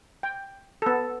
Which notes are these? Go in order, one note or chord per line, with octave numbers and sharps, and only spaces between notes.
G5
B3 A4